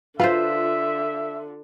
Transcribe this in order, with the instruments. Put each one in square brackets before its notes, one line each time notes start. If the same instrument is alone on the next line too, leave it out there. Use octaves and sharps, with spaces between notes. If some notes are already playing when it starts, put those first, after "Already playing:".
[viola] D3 [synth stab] F4 [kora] B4 C5 [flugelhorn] E5